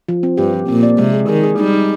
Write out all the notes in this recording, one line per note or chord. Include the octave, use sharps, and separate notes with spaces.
F3
C4
G2 G4
F3
A#2 C4
D5
C3 G#3
G#4
D#3 G#4
G#4
G3 D#4
D#4